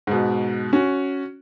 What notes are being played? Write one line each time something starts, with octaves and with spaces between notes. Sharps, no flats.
G#2 B2
C#4 F#4